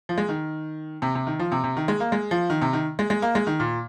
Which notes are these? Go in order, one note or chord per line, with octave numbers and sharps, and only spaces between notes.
F3
G#3
D#3
C3
C3
D#3
F3
C3
C3
D#3
G#3
A#3
G#3
F3
D#3
C3
D#3
G#3
G#3
A#3
G#3
D#3
A#2